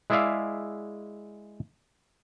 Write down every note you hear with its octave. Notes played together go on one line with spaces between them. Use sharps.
G#3 E4 G#4 D5 E5 F5